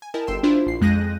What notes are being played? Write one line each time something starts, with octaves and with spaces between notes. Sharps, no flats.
G#5
E4 A#4 D#5 G5 A5
G1 G5 C6 E6 C7 E7
D4 E4 F4 C5 C6
A#1 C7
F2 G#3 F#6 G6 A#6 D#7